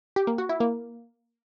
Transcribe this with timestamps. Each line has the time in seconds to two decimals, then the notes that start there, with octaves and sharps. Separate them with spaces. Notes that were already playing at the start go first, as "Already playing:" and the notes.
0.16 G4
0.27 A#3
0.38 F#4
0.49 E4
0.60 A#3